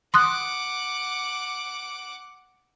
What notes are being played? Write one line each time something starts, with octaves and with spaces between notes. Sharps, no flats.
F#5 C6 D6 D#6 F#6